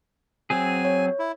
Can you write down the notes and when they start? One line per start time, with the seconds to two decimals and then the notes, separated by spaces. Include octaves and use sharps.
0.50 F#3 C4 G#4 G#5
0.85 C#5
1.19 E4